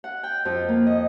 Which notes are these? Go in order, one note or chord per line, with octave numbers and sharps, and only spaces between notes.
F#5
G5
F2
A#3
D#5